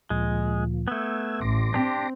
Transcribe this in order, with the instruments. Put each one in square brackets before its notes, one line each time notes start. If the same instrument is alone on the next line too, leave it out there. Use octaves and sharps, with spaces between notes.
[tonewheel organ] D2 A#2 F3 [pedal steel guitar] G#3
[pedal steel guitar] A3 B3 [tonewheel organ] E6 G#6
[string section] A1 [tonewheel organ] C6 D6 A#6
[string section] C4 [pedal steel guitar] D4 G4